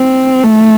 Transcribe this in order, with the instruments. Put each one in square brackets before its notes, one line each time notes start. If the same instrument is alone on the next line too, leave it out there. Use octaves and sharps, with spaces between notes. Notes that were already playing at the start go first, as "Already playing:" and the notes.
Already playing: [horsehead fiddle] C4
A3